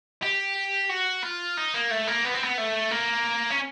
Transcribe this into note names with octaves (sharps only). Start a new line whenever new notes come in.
G4
F#4
F4
D#4
A#3
A3
A#3
B3
C4
B3
A3
A#3
C#4